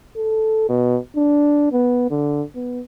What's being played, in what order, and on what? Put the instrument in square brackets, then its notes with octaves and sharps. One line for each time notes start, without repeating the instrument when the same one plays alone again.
[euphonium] A4
B2
D4
B3
D3
B3